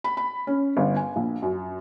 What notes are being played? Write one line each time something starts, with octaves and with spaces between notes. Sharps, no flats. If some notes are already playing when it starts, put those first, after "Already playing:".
B5
B5
C#4
G1
G#5
A#1
F#2